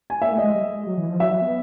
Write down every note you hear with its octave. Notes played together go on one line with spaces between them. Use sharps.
G#5
A#3 E5
A3
D#5
G#3
G3
G#3
G#3
F#3
E3
F3
F#3 E5
F#3
B3